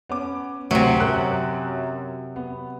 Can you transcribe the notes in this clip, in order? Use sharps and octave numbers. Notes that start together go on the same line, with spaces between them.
B3 C#4 D6
D2 C3 F#3
F#2 A#4 F#6
B3